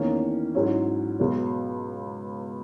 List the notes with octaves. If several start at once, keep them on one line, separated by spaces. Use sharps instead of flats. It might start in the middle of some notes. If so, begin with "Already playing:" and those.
Already playing: E2 D#3 A#3 C#4 E4
G#2 F#3 C#4 E4
C#2 B2 F#3